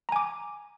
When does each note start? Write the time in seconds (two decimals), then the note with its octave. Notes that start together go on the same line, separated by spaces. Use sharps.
0.09 A#5
0.12 G#5
0.16 D6